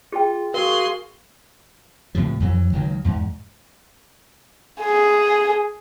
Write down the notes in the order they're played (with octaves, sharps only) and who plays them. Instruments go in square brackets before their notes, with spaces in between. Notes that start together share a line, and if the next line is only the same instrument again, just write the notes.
[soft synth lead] F4 [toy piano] G#4 G5
[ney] F#4 [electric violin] G#4 C6 [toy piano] A#4 [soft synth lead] F5
[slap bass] C#2 A2 C3 F3
F2 E3 F#3
C#2 D#3 F#3
E2 G#2
[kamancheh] G#4